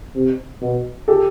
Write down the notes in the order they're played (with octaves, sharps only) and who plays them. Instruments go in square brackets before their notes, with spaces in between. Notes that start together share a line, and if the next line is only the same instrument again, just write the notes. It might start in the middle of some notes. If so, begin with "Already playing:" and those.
[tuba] C3
B2
[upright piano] G4 A4